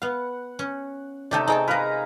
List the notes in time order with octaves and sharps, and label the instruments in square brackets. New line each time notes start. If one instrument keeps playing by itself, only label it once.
[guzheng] B3 F5 [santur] F#5
[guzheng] C#4
[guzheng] C3 A3 D#4 [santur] D5 G5 A5
[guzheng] C4 G5 A5 [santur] D#4 G#4
[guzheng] G#3 A#4 [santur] B4 F5 A#5